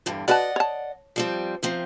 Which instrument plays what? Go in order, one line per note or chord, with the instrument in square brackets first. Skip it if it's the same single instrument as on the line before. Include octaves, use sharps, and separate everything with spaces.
[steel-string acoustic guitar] E2 G2 D3
[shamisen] F#4 B4 A5 [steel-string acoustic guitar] D5 D#5 F#5
[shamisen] C#5 A5
[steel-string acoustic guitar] F3 G3 C4
C3 F3 C4